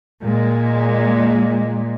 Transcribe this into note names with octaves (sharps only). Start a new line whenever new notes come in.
A#2 G#3